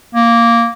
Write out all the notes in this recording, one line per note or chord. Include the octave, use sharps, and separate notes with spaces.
A#3